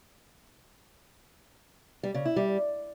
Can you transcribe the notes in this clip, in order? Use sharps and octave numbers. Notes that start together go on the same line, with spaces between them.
G3
C#3
E4
G3